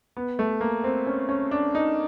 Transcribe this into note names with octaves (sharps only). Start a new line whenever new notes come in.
B3
A3
A#3
C4
C#4
C#4
D4
D#4